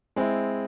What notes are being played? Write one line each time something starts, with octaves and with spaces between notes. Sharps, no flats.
G#3 C4 E4